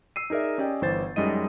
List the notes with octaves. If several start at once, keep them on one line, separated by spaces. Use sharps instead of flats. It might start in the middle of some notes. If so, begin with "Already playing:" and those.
E6 C7 D#7
D#4 G#4 A#4 D5 E5
C#4 G4 D5 D#5 G5
G1 E3 C5 A6
F#2 G3 G#3 D#4 D#5 D#7